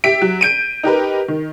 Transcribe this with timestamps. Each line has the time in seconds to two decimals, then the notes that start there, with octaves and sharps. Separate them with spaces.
0.04 G4 E5 B6 D7
0.22 F#3
0.41 G6 D7 D#7
0.83 D#4 G4 A#4 B4
1.28 D#3